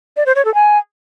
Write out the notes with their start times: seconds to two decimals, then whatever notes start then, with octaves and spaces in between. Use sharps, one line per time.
0.17 D5
0.26 C5
0.36 C#5
0.45 A4
0.54 G#5